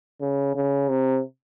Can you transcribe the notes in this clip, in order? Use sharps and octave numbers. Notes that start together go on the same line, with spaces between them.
C#3
C#3
C3